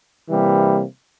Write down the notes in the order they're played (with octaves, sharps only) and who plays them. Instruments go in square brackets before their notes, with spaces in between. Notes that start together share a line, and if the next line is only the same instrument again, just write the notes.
[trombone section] C3 E3 G3 A#3